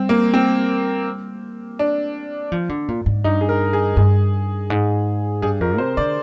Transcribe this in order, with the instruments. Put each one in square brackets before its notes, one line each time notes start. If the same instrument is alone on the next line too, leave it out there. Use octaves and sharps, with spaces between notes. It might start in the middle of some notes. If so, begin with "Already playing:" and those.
Already playing: [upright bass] G3 [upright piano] C4
[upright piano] A#3
C4
D4
[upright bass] F3
D3
A#2
G#2
[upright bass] G2 [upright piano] D#4
[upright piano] G#4
A#4
G#4
[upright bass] G2 [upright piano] G#4
[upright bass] G#2
[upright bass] G2 [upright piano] G#4
[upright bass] F2 [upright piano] A#4
[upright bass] C3 [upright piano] C5
[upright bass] D3 [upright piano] D5